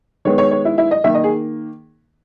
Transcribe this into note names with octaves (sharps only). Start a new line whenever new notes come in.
D#3 G#3 B3 C#5
C#5
C#5
E4
E4
D#5
D#3 A#3 E5
D#5
G#4